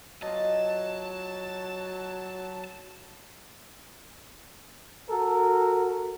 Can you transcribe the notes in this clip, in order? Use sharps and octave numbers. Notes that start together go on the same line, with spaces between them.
F#3 F4 D#5 A5
F#4 A4 A#4